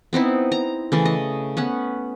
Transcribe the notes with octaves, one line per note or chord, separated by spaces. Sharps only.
B3 C4 D#4 E4
A#5
C#3 E3 A3
D#5
B3 C#4 F#5